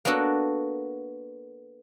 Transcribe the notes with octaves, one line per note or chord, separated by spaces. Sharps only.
A#3 B3 D4 F#4 A4